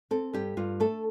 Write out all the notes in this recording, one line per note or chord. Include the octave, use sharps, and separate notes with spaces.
C4 A4
G2 G4
G2 F4
A3 A4